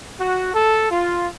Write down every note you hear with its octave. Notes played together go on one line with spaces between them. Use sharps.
F#4
A4
F4